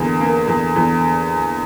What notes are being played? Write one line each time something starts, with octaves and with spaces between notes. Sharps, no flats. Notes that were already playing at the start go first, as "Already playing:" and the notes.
Already playing: E2 D3 A#3
A#3
E2
E2